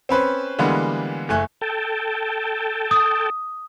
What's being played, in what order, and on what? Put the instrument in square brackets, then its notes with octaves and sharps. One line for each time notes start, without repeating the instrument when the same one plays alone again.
[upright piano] C4 C#4 B4 C5
D3 E3 G3 G#3 A#3 B3
F#1 A3 G#5 F#6
[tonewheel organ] A4 G5 A5
[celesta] D#6